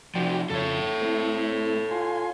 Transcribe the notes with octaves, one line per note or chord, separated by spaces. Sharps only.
C3 F3 F#4 D5 G5
F2 C#3 A4 C#5
A3 C4 E4
F4 G#5 C6